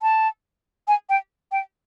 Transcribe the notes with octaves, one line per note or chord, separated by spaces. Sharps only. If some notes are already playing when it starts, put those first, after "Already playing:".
A5
G#5
G5
G5